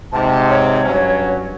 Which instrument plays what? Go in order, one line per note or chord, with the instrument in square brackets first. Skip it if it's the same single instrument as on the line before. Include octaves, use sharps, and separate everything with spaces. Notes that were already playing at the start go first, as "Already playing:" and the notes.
[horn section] G#2 C3 [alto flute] A5
[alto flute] C#5
[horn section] G2 F#3 C#4